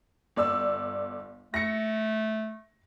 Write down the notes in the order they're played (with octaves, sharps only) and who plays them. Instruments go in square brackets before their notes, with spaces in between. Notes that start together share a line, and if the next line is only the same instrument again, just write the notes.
[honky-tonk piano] G1 D5 E6
[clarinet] A3 [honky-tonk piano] A#6 C#7